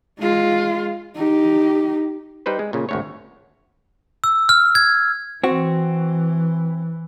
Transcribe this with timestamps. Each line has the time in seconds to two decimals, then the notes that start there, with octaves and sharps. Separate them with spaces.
0.19 G#3 F4
1.16 D#4 G4
2.46 G3 D#4 B4 C5
2.59 G#3
2.73 A#2 C#3
2.89 G#1 D2 C#5
4.24 E6
4.49 F6
4.75 G#6
5.44 E3 C4 F#4